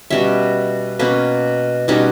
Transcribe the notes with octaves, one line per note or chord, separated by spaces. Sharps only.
B2 G3 C#4 E5
B2 A#3 C#4 B4
B2 G3 C#4 D#4